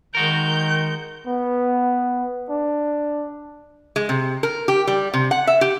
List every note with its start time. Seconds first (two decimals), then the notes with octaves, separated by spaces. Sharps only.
0.15 D#3 G#3 F#4 A#4 G6
1.27 B3
2.50 D4
3.96 G#3
4.09 C3
4.43 A#4
4.68 G4
4.87 G3
5.14 C3
5.31 F#5
5.47 E5
5.61 G4